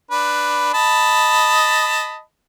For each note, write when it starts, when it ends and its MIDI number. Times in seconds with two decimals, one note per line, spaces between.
0.11 0.72 62
0.11 0.72 71
0.74 2.20 75
0.74 2.20 81
0.74 2.20 83